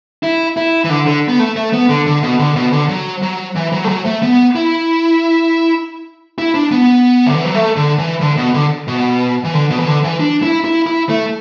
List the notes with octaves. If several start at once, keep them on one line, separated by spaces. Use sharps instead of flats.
E4
E4
E3
D3
D3
B3
A3
A3
B3
D3
D3
B2
D3
B2
D3
F#3
F#3
E3
F#3
A3
F#3
A3
B3
E4
E4
D4
B3
D3
E3
F#3
A3
D3
E3
D3
B2
D3
B2
E3
D3
B2
E3
D3
E3
D4
E4
E4
E4
A3